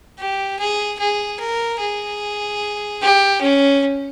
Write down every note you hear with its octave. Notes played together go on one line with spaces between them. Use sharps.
G4
G#4
G#4
A#4
G#4
G4
C#4